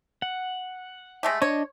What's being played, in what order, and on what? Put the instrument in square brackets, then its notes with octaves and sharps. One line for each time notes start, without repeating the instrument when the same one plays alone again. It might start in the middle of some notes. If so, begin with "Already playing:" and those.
[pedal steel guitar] F#5
[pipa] G#3 A3 G4
[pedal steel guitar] D4 D#5 [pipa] C#5